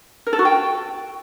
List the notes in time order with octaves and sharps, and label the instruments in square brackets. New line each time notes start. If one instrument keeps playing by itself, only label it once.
[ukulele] A#4
A4
F#4
G5